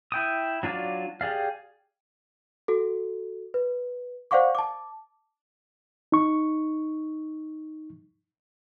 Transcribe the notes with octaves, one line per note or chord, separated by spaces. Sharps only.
E4 G5 D#6
F#3 D4 F4 C#5 D5
G4 G#4 D5 F5
F#4 A4
B4
C5 D5 F5 F#5 C#6 D6
A5 D6
D#4 C#6